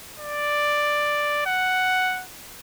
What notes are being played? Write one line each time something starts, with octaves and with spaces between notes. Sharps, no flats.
D5
F#5